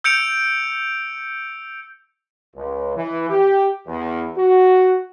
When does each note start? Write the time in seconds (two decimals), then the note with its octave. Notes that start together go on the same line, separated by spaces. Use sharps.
0.04 E6 G6 C#7 D7 F7
2.56 C#2
2.97 E3
3.30 G4
3.87 E2
4.37 F#4